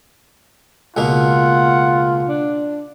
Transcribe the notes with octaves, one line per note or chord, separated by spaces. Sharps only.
C#2 B2 A#3 F4 F#5
D4